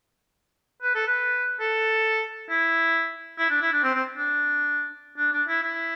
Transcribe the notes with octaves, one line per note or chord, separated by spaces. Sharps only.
B4
A4
B4
A4
E4
E4
D4
E4
D4
C4
C4
D4
D4
D4
E4
E4